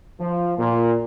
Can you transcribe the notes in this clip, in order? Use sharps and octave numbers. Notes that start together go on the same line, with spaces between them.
F3
A#2